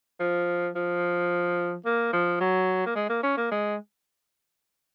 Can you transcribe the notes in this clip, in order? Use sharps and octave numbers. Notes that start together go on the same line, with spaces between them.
F3
F3
A#3
F3
F#3
A#3
G#3
A#3
C#4
A#3
G#3